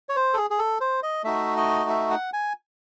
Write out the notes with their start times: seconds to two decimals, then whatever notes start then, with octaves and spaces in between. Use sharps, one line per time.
0.09 C#5
0.16 C5
0.34 A4
0.37 G#4
0.50 G#4
0.59 A4
0.81 C5
1.03 D#5
1.24 A3 D#4 F#4 E5
1.57 D#5
1.90 E5
2.11 F#5
2.33 G#5